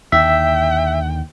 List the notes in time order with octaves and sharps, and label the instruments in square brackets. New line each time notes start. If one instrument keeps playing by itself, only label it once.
[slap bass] D#2 D3 [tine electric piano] E5 [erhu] G5